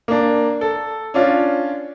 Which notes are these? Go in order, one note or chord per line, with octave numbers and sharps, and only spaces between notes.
A#3 D4
A4
C#4 D4 F4